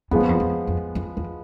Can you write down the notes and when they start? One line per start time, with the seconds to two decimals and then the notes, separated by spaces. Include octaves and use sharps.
0.11 F2 F3 G#3 B3
0.20 G#2
0.29 F2
0.40 F2
0.67 F2
0.95 F2
1.17 E2